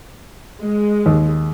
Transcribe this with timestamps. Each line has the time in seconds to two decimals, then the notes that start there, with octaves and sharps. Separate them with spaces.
0.60 G#3
1.06 D#2